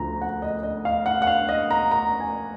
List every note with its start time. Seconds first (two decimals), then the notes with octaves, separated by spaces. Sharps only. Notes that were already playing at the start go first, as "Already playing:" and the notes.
Already playing: D2 D3 F3 A#5
0.21 F#5
0.42 D#5
0.63 D#5
0.85 F5
1.06 F#5
1.22 F#5
1.27 F5
1.49 D#5
1.71 A#5
1.91 A#5
2.20 G#5